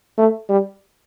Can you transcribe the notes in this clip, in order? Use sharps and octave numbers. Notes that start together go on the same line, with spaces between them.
A3
G3